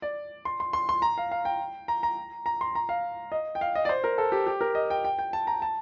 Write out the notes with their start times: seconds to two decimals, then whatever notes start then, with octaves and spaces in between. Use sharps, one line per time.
0.02 D5
0.45 C6
0.60 C6
0.73 C6
0.89 C6
1.02 A#5
1.18 F5
1.32 F5
1.45 G5
1.88 A#5
2.03 A#5
2.46 A#5
2.61 C6
2.75 A#5
2.89 F5
3.32 D#5
3.55 G5
3.61 F5
3.75 D#5
3.85 D5
3.89 C5
4.04 A#4
4.18 A4
4.32 G4
4.47 G4
4.61 A#4
4.75 D#5
4.90 G5
5.05 G5
5.19 G5
5.33 A5
5.47 A#5
5.62 A5